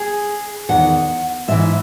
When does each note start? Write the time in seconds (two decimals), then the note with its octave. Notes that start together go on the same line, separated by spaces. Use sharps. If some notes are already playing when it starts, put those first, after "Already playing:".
Already playing: G#4
0.69 E2 D#3 F#5
1.48 G#2 E3 E5